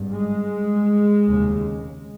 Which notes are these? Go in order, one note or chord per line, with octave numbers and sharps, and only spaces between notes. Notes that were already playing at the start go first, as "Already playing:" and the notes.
Already playing: G#1 G2
G#3
F1 D#2 C#3